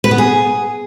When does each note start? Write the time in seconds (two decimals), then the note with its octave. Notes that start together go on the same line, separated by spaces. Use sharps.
0.04 B4
0.11 B3
0.18 G#4